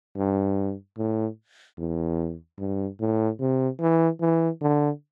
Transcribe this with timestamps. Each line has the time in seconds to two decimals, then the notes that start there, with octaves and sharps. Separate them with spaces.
0.17 G2
0.98 A2
1.78 E2
2.59 G2
3.00 A2
3.40 C3
3.80 E3
4.21 E3
4.61 D3